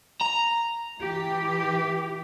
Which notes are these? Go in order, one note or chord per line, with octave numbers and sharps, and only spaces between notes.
A#5
E3 G4